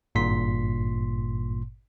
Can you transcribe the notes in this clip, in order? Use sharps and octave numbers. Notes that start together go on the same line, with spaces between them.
G#1 G2 A#2 C6 B6